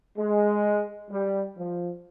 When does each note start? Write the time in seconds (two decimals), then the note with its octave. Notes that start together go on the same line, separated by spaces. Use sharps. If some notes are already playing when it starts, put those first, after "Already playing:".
0.18 G#3
1.10 G3
1.57 F3